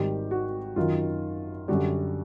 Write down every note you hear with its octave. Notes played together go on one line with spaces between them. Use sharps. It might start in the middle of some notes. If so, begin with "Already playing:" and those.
Already playing: G#1 G#2 D#3 G3 G4
F#4
F#2 D#3 F#3 F4
F#2 D3 G3 F#4